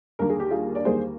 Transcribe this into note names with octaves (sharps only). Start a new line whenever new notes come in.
D#2 D3 G3 A#3 A#4
G#4
G4
F4 G#4
D5
D#2 D3 G3 A#3 G#4 C5